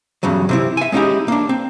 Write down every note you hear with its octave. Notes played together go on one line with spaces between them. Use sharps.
E2 G2 C#3 F#3
C3 C4 E4
E5 G#5
G#3 C4 C#4 D#4 E4 G4
A#3 D4
C4